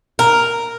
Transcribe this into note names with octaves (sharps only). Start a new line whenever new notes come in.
A#4